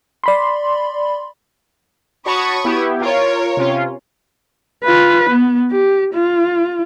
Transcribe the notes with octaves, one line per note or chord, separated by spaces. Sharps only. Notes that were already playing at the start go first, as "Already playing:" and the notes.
D5 B5 C6
F#4 C#5 A5 B5 C#6 D#6
B3 E4 G4
F4 A#4 C#5
C3 C#4 F4
F4 B4
B3
G4
F4